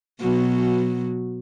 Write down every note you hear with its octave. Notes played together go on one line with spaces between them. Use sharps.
B2 F#3